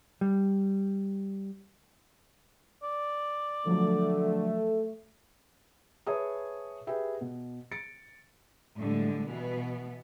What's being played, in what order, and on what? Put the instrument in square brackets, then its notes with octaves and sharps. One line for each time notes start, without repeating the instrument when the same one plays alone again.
[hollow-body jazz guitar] G3
[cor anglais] D5
[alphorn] D3 [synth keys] F3 F#3 [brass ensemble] A3
[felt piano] G#4 B4 C#5 E5 A5 D#6
G4 G#4 B4 E5 G5
B2
A6 C#7 D7
[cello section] A2 D3 G3 G#3
B2 E3 B3